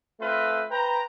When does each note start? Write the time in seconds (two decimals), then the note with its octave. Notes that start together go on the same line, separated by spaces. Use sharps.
0.20 A3 C4 F4 A4 B4
0.71 B4 C5 G5 A#5